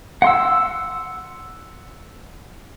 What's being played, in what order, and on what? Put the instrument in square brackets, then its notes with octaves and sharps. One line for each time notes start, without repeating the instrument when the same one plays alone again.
[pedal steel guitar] F#5 C6 E6